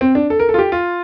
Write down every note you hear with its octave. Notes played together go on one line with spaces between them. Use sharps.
C4
D4
A4
A#4
A4
F4
G4
F4